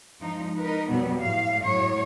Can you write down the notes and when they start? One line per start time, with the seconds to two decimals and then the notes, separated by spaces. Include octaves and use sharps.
0.19 F3 G#3 D#4
0.57 D#4 A#4 B4
0.89 F2 B2 F#3 G3 B3
1.19 A2 F5
1.62 F#2 A2 F#3 C#5